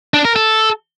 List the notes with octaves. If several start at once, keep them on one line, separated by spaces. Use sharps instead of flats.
D4
A#4
A4